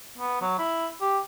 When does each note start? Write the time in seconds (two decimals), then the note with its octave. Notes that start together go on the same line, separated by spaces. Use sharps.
0.18 B3
0.42 F#3
0.59 E4
1.01 G4